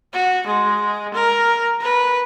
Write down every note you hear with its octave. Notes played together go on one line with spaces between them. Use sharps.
F#4
G#3
A#4
B4